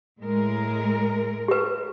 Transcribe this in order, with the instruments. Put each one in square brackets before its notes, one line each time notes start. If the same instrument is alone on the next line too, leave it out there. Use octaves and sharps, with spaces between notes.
[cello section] A2 G#3 A#4
[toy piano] G4 B4